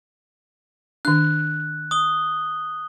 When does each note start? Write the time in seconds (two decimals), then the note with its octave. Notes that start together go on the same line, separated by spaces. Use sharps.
1.05 D#3 D4 F#6
1.91 D#6 G7